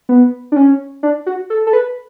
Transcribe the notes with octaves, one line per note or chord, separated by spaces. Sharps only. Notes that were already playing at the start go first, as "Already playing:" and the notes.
B3
D4
C#4
D4
F#4
A4
A4
B4